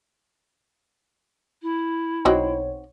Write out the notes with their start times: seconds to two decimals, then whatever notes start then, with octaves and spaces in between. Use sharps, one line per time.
1.62 E4
2.25 B1 C4 D#4 F#4 C#5